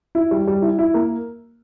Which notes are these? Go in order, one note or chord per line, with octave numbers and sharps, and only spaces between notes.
E4
G3
G3
E4
E4
A#3